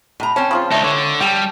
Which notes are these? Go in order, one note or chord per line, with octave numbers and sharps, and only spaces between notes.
A2 A#5
C4 C#4 A5
C#3 F3 F4
C#2 A3 D4 D#4
D3 C#5
G3 G5 A5